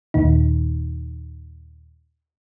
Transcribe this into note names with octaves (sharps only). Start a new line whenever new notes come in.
D#2 A#2 D#3 D#4